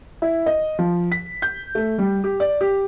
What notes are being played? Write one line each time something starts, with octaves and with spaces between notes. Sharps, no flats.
E4
D#5
F3
B6
G6
A3
G3
G4
D5
G4